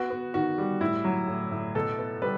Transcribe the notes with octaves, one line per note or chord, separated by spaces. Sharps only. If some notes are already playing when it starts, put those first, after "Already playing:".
Already playing: B3 F#4
B3
D#3 F#4
G3
A2 E4
F#3
A2
A2
B2 A4
B3
G3 B4